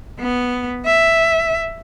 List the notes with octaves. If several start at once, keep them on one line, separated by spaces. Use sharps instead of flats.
B3
E5